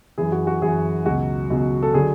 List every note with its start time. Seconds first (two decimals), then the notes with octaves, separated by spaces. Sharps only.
0.18 F#2 E3 G#4
0.32 F#4
0.47 F#4
0.62 F#2 E3 G#4
1.06 C#2 B2 F#3 F#4
1.50 C#2 B2 F#3
1.83 A4
1.94 D3 F#3 G#4